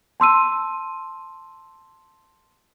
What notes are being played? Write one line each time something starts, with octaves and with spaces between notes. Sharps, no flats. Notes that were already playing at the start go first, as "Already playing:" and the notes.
A5 C6 E6 D#7